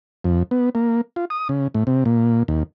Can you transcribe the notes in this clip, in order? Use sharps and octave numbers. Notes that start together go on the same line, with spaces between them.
F2
B3
A#3
F4
D#6
C#3
A2
C3
A#2
D#2